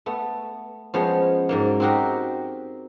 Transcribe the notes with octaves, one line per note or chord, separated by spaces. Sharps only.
A3 B3
F3 G#3 B3 C#4 C5 C#5
G#2 F#3 A#3
C4 D#4 F#4 G4 A#4 C5